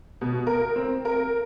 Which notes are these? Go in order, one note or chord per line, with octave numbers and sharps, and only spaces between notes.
B2
A#4
C4
A#4